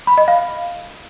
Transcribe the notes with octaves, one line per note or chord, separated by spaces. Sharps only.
B5
D#5
F5